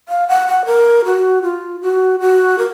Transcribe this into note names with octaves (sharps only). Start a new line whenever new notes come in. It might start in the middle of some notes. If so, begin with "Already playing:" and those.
F5
F#5
F#5
A#4
F#4
F4
F#4
F#4
A#4